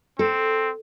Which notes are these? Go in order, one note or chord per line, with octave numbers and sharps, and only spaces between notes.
C4 A4